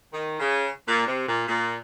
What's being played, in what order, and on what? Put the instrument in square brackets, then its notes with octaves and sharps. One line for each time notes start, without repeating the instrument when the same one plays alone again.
[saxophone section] D#3
C#3
A#2
C3
A#2
A#2